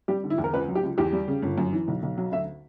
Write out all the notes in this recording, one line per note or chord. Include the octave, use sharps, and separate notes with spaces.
G3 G4
D3
E4
E2
A#4
C#2 B4
F#3
G4
C#2
E2 G4
G3
C#3
G1
F#2
E3
B1
B1
F#3
D2 E5